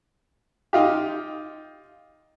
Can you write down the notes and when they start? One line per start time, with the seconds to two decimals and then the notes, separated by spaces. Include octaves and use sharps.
0.73 D#4 F4 G4